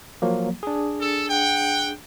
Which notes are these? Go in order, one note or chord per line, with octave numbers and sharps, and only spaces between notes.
F3 F#3 A#3
D4 G#4
A4
F#5 G5